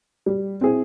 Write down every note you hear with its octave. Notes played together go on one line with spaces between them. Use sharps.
G3
C4 E4 G#4